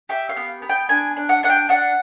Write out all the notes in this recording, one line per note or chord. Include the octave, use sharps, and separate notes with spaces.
G4 E5
F5
B3
B3
G5
D4 G#5
D4
F#5
D4 F#5
G5
D4 F#5